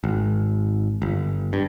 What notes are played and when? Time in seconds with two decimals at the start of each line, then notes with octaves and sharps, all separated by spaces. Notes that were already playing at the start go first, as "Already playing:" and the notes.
0.04 G#1
1.02 G1
1.53 G2